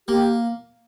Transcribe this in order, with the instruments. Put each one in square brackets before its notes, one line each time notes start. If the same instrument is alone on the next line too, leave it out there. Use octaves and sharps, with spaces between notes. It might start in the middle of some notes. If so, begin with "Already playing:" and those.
[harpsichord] A#3 [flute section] G4